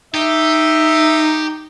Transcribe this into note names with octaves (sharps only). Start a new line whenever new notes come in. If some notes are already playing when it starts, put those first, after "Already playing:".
D#4 G4 E5